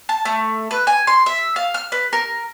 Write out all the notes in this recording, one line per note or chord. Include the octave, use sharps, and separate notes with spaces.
A5
A3
B4
G#5
C6
E5
F5
F6
B4
A#4